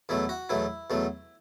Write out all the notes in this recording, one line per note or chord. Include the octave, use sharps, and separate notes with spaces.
E2 B2 F#3 A3 E4
F#4
E2 B2 F#3 A3 E4
E2 B2 F#3 A3